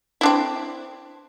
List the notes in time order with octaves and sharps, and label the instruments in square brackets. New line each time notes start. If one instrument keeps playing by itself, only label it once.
[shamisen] C4 D4 E4